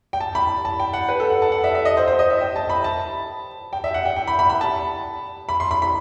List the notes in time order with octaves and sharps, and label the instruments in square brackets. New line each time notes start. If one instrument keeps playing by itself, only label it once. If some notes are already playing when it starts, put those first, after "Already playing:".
[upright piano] G5
A5
B5
A5
G5
F#5
B4
A4
F#5
A5
F#5
E5
E5
D#5
C5
C5
D#5
E5
G5
A5
B5
A5
G5
E5
F#5
G5
G5
B5
B5
B5
A5
B5
C6
B5
B5